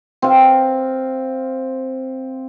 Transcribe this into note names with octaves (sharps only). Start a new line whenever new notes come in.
C4 F5